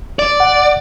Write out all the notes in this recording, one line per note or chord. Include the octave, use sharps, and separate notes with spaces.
D5
F#5